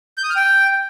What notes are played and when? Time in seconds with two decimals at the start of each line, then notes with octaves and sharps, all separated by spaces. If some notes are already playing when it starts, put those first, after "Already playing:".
0.18 G6
0.24 D#6
0.30 F6
0.36 G5